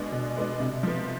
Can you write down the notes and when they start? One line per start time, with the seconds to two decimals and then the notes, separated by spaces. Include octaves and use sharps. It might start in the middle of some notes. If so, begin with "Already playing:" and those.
Already playing: B2 G#3 B3 D4
0.12 B2
0.37 G#3 B3 D4
0.60 C3
0.83 F3 B3